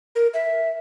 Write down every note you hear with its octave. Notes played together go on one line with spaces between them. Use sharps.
A#4
E5